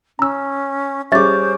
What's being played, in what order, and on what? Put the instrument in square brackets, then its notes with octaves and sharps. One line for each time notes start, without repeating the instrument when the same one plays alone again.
[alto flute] C#4 [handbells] A#5 E6
[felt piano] G3 G#4 [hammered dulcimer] C#4 D6 [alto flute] C5 [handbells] E5 A6